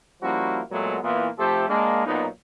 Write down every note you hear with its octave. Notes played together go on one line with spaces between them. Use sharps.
F3 G3 A#3 C#4 E4 F#4
A#2 F#3 G#3 A3 B3
A#2 E3 A#3 B3 E4 F4
C3 F3 A3 G4 A4 C5
G#3 A#3 D4
B1 A#2 F#3 B3 D#4